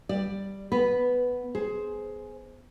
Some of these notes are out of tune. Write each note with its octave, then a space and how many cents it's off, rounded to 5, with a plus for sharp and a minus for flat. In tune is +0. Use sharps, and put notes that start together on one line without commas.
G3 +0 D5 +10
B3 +0 B4 +0
G#4 +15 C5 +0